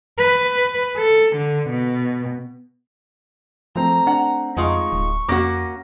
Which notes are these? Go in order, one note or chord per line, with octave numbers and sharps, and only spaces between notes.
B4
A4
D3
B2
F3 A3 C4 A#5
D4 F#5
F2 G#3 D#4 F4 C#6
D1
F2 A#3 C#4 F#4 D6 A#6